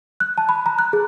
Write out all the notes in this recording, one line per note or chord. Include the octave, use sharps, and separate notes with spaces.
F#6
A5
B5
A#5
F#6
G#4